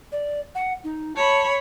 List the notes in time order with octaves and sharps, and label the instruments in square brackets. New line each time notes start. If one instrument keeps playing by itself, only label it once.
[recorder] D5
F#5
D#4
[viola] C#5 B5 [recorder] A5